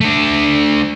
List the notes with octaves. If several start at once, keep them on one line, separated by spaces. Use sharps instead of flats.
A3 D4